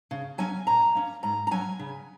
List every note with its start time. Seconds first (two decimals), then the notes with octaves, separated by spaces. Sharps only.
0.11 C#3
0.38 F#3 C#4 G#5
0.67 A#2 A#5
0.95 A#3 C#4
1.23 G#2 A#5
1.47 A#5
1.51 F#3 C#4 G#5
1.79 C#3